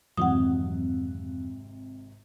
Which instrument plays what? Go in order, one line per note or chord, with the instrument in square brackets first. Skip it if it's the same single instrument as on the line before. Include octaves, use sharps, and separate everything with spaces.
[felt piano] G#1 C3 [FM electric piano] F2 E3 F#3 [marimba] F#5 D#6